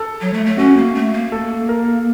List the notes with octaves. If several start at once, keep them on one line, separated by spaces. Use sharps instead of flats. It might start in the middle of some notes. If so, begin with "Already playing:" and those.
Already playing: A4
F#3
A3
A3
C#4 F#4
A#3
A3
A#3
A4
A#4